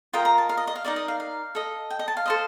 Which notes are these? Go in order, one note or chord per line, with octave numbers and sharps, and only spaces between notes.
F4 A#4 D#5 G5
A#5
A5
F5
D#5
D#5
F5
D#4 A#4 D5 D#5
D#5
F5
F5
A4 D#5
G5
D#5
A5
F5
A4 C5 D#5